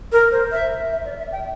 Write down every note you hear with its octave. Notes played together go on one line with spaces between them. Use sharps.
A#4
C5
E5
E5
D5
E5
G5